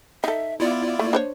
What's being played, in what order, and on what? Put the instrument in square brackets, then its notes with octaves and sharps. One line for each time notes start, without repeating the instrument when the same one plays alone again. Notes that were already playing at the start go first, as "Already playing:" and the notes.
[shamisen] D#4 A4 [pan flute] E5
[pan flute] B3 [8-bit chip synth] E4 F4 D5
[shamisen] A3 [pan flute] A#3
[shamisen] D4 C5 C#5